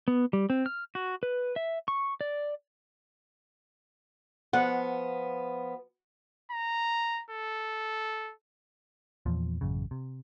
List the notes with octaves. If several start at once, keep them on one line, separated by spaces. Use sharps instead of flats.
B3
G3
C4
F6
F#4
B4
E5
C#6
D5
F3 B3 F#5
A#5
A4
E2 A#2 F3
A1 F#2 C#3
C3